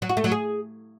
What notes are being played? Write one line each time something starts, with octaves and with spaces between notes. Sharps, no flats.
F#3
F#4
A3
F#3
G#4